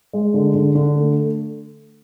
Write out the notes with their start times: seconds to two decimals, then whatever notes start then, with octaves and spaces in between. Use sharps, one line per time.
0.13 G#3
0.34 D3
0.54 D3
0.75 D3
0.95 A3